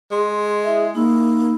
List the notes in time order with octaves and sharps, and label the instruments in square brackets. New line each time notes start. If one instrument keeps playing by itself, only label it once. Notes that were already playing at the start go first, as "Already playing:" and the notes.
[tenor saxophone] G#3 [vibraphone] C6
[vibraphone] E4 E5
[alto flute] A#3 [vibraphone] D#4 B5 E6